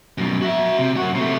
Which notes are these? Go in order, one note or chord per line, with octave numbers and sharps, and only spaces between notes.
F#2 B2
F#4 E5
C3
F#2 F#4
C3 A3